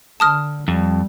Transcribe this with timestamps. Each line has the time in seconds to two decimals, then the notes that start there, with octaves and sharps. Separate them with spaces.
0.20 D3 A5 D#6 F6
0.68 F2 G3